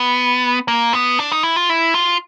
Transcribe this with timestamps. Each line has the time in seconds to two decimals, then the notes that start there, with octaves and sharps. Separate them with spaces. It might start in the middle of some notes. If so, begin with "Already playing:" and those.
Already playing: B3
0.68 A#3
0.93 B3
1.19 D4
1.31 D#4
1.43 E4
1.56 F4
1.69 E4
1.94 F4